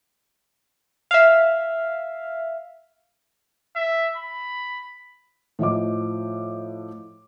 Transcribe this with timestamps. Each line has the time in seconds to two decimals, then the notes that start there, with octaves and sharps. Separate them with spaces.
1.11 E5 F5
3.76 E5
4.16 B5
5.59 A2 F3 D#5 D6